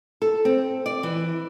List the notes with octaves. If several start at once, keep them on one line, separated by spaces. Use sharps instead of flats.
A4
C4
D5
E3